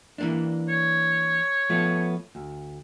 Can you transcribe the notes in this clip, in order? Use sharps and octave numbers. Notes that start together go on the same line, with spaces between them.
E3 A#3 D4
C#5
F3 A3 B3
D2